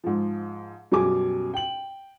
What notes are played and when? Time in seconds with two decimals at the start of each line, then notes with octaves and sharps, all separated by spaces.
0.04 G#2 F3
0.92 F#2 B2 G3 G#4 G#5 D6
1.54 G5 F#7